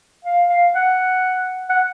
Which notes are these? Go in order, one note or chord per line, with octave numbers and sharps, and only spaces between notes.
F5
F5
F#5
F#5